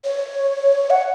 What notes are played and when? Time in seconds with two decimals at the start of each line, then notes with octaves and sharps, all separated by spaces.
0.05 C#5
0.90 F#5